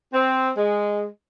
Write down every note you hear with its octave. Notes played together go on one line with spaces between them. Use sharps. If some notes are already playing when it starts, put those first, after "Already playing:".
C4
G#3